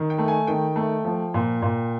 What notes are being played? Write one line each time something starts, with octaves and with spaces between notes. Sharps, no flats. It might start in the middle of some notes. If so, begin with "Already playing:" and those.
Already playing: D#3
G5
A3
G#5
D#3 G5
A3
F3
A#2
A#2